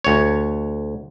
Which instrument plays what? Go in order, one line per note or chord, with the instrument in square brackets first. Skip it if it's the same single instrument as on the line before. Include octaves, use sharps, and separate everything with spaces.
[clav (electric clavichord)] D2 C#5